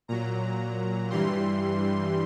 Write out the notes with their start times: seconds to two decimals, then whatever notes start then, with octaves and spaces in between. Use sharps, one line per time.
0.08 A#2 F#3 A#5
1.10 G2 E3 G3 C6